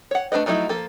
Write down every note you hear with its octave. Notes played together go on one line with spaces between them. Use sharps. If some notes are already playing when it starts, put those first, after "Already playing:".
C#5 F#5
A3 D4 A#4 B4 D#5
F3 F#3 A3 D#4 E4
F3 A#3 A4